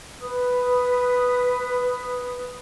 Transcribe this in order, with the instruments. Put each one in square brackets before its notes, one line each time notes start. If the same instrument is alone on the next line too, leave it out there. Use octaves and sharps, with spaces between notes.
[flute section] B4 D#6